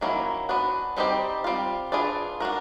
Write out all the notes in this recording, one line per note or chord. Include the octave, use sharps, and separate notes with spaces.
D#3 F#3 A#3 C#4 E4
B3 D4 F#4
G3 C4 D#4 G4 C5
G3 C4 F4
D4 F4 G#4 B4 D5
D4 F#4 A#4